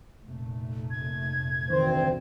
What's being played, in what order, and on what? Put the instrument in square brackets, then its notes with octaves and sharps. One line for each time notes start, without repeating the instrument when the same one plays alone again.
[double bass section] F1 A#2 A3
[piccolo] G#6
[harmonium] D2 C4 C5 [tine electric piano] D#3 E3